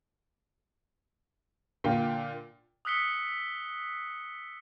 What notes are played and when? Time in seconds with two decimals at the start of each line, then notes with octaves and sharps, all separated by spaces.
1.84 A#2 D3 F5 G5
2.85 D#6 E6 F#6 B6 C#7 G7